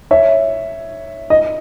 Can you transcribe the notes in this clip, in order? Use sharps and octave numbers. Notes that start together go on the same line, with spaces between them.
C#5 E5
D#5